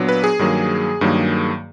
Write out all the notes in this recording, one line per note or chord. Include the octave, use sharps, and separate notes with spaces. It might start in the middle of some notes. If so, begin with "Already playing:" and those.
Already playing: A#2 F#3 B3 D4
B4
G#4
G2 D#3 F#3 A#3
G2 D#3 F#3 A#3